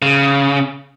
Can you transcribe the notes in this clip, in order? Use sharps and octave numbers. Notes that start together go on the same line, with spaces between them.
C#3